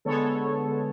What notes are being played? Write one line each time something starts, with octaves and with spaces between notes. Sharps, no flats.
D3 G#3 B3 A4 C#5